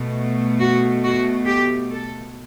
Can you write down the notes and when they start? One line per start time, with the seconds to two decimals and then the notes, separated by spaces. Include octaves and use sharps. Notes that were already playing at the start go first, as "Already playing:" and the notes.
Already playing: B2 A3
0.60 F#4
1.03 F#4
1.46 G4
1.91 A4